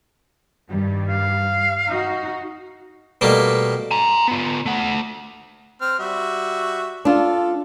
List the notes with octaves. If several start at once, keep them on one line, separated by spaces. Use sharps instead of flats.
G2 D#3 G3
F5
D#4 F#4
B2 G3 A3 A#3
G#5 A#5
B3 F4
A3 F#5
C4 F6
G3 F#4 E5
D4 F4 A4